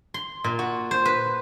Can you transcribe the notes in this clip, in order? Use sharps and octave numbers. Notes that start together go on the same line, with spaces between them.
C6
A#2
F#4
C5
B4